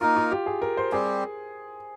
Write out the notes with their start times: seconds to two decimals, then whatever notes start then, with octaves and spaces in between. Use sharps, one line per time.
0.01 A#3 D#4 F4 A#4
0.17 F4
0.32 G4
0.46 G#4
0.62 A#4
0.77 C5
0.92 G3 C4 G4 G#4